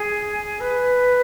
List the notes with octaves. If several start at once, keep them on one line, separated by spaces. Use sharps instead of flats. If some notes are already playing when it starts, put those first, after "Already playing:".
Already playing: G#4
B4